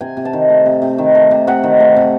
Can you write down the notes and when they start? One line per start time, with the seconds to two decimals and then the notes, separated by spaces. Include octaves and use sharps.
0.01 C3 G#5
0.17 C3
0.25 A5
0.33 D#3
0.49 A3
0.66 C3
0.82 C3
0.98 D#3
1.15 A3
1.31 C3
1.47 C3 F#5
1.63 D#3
1.80 A3
1.96 C3